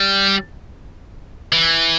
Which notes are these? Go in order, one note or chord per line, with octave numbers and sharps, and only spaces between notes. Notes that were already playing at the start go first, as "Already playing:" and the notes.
Already playing: G3
E3